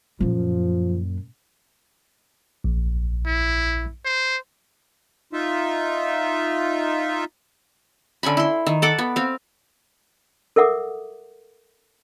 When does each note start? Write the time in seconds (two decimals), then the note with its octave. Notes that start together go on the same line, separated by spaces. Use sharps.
0.20 F#2 A#2 F3
2.64 A#1
3.26 E4
4.05 C5
5.33 D#4 F4 E5
8.23 D3 C#4 G#5 B5
8.37 E4 C6
8.66 D#3
8.82 A4 F#5 D6
8.99 B3
9.16 C4 F5
10.56 A4 A#4 E5 F#5 D6 D#6